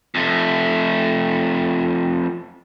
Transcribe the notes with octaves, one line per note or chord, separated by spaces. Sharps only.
F2 A3